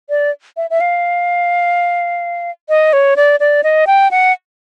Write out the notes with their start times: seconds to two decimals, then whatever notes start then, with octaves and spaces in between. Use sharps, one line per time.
0.10 D5
0.57 E5
0.70 E5
0.81 F5
2.69 D#5
2.93 C#5
3.16 D5
3.40 D5
3.64 D#5
3.87 G5
4.11 F#5